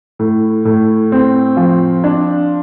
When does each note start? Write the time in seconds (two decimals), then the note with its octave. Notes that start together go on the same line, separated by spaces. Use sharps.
0.19 A2
0.65 A2
1.12 C4
1.57 F3
2.04 D4